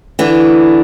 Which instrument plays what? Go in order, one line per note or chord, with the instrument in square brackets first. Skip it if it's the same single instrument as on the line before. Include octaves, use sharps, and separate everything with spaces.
[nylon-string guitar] D3 E3